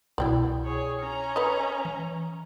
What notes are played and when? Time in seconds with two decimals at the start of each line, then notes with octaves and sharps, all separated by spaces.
0.18 C2 B2 E4 D5 G5
0.65 G#4 C#5
1.00 C#4 A#5
1.36 B4 D#5
1.85 E3